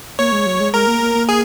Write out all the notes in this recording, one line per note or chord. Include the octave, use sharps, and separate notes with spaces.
A#3 C#5
G#3
F#3
G#3
G#3 A#4
A#3
A#3
A#3
G#4